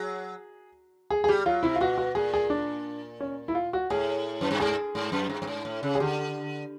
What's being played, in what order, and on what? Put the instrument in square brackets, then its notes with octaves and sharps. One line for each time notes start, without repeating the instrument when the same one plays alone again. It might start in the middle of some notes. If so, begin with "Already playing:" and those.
Already playing: [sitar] F#3 [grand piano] G#4
[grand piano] G#4
G#4
[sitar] G3 [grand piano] G4
[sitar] F#3 [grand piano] F4
[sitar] C3 [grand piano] E4
[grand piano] F4
[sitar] B2 [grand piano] F#4
[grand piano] F#4
[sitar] A#2 [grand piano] G#4
[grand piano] G#4
D4
C#4
E4
F4
F#4
[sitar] A2 [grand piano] G#4
[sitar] F#2
G2
[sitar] G#2 [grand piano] G#4
[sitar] G#2
F#2
G2
G2
G#2
A2
C#3
[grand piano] G#4
[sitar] D3 [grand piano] G4